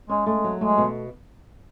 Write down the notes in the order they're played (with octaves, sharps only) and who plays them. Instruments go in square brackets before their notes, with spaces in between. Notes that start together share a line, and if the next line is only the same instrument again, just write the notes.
[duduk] G#3 [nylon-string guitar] C#4
[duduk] G#3 [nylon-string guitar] A3
[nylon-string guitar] F#3
[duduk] G#3 [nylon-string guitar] A3
[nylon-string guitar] B2